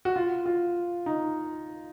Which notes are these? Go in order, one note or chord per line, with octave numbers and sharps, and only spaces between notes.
F#4
F4
F4
D#4